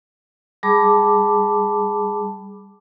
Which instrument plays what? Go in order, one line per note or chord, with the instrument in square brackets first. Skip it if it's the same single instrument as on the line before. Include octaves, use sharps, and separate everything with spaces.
[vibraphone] G3 G#4 A5 B5 D6